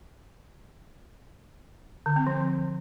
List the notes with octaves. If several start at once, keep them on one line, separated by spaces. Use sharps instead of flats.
D3
C4
F3